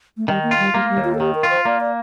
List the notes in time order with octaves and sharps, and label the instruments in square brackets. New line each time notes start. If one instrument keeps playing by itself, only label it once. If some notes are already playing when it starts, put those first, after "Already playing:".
[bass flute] A3
[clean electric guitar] D#3 [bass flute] G3
[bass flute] A#3
[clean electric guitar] F4
[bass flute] G3
[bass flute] G3 [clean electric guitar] A#3
[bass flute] A3
G3
[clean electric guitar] D#2
[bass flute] F4
A4
[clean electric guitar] D#3 [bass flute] G4
[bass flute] A#4
[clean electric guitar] F4
[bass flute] C5
[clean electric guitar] A#3 [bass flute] D5
[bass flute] D5